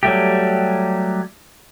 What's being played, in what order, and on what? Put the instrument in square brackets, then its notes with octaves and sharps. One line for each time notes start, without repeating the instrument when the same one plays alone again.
[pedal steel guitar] F#3 G3 A3 G4